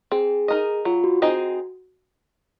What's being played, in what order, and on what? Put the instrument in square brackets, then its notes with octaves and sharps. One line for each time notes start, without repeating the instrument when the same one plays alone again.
[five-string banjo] C4 [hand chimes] G#4
[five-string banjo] D#4 A#4 D#5
[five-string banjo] F#3 [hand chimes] F4
[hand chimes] F#4
[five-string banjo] C4 D#4 G#4 D#5 [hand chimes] F#4